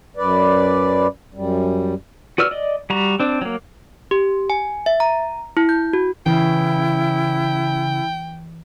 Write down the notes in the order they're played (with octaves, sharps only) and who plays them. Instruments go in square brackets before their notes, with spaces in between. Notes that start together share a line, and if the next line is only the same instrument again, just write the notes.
[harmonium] F#2 B4 D5
F#2 G3
[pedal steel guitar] F#4 B4 D5 E6 F6
D5 D#5
G3 F#4 A#5
C4 D4
F#3 A#3
[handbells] G4
G#5
E5
A#5
E4
G6
F#4
[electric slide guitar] C#3 [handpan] E3 [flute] E4 [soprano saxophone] G5